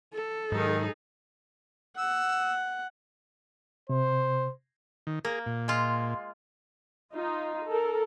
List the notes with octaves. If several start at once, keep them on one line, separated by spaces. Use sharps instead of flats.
A4
G#2 D#3 F#3 D#4 G#4
F#5 E6
C3 C5
D#3
A#3 G#4 A#4
A#2
G#3 F4
D#4 F4
A4 A#4